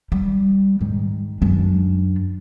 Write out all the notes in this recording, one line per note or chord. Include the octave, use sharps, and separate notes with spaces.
G3
G#2 D#3
F#2 D4